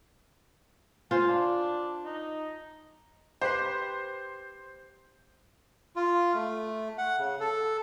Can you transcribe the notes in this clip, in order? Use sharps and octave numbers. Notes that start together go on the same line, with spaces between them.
F4 C5 G#5
D4
D#4
G4 B4 C5
F4
A3
F#5
C#3
A4